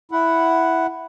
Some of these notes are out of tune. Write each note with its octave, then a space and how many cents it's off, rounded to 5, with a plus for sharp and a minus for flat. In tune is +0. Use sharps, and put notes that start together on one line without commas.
E4 +0 F#5 +0